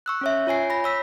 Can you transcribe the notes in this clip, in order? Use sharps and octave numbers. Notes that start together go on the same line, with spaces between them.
C#6 E6 F#6
C#4 C#5 E5
F4 C#5 G#5 C7
B5 A#6
C#5 E6 B6